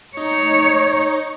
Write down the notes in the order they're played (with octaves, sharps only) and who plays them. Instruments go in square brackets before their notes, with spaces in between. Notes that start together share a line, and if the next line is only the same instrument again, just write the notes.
[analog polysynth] D#4 [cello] C#5